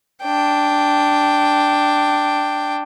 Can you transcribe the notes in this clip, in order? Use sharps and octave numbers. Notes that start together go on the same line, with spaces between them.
D4 G5